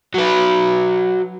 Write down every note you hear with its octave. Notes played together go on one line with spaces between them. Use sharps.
F#3 B4